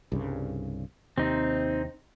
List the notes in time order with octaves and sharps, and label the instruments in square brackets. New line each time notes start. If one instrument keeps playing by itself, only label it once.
[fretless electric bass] C2 G2 C#3
[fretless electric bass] D#2 C3 [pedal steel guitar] C4 D#4